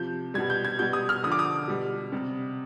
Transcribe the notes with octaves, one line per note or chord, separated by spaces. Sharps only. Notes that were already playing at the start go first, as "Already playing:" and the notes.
Already playing: C3 F3 G6
B2 G3 G#6
G6
G#6
B2 G3 G6
D#6
F6
D3 F3 D#6
D6
D#6
B2 G3
C3 G3